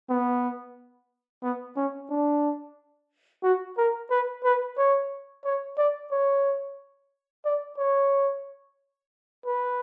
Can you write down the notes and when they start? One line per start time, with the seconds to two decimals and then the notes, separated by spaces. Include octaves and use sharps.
0.09 B3
1.43 B3
1.76 C#4
2.10 D4
3.43 F#4
3.77 A#4
4.11 B4
4.44 B4
4.78 C#5
5.45 C#5
5.78 D5
6.12 C#5
7.45 D5
7.78 C#5
9.46 B4